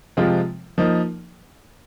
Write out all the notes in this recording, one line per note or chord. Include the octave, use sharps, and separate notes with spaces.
C3 F3 G#3 C4 F4
F3 A#3 D#4